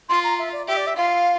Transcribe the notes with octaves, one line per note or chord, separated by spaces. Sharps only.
F4 C6
A#5
E5
D5
G4 E5
D5
E5
F4 F5